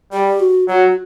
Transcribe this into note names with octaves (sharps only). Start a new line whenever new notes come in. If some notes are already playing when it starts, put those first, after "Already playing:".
G3 G4
F#4
F#3 F#4